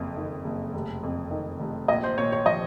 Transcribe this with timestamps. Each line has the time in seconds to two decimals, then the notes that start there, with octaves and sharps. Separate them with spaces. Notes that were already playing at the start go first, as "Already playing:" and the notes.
Already playing: F#1 F2
0.17 D#3
0.44 F#1
0.74 F1
1.03 F2
1.31 D#3
1.59 F1
1.88 A#1 D#5
2.03 C5
2.18 A#2 C#5
2.32 C#5
2.46 F3 D#5